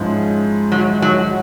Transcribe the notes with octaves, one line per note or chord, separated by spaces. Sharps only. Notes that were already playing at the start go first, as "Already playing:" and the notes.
Already playing: G#2 F3 G#3 C#4 E4
F#3
F#3